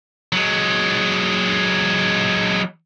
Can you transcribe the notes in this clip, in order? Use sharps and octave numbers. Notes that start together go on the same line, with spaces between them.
F#3 G#3